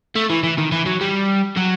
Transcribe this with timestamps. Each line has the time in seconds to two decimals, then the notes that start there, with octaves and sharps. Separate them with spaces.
0.15 A3
0.30 E3
0.43 E3
0.58 D#3
0.72 E3
0.86 F#3
1.01 G3
1.57 F#3